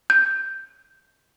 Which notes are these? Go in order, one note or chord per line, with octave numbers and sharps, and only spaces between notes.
G6